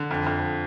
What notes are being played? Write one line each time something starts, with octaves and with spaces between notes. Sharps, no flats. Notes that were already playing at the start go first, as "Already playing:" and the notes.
Already playing: D3
F2
F2